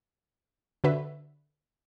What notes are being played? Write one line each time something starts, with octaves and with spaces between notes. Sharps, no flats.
D3 F#4 B4 E5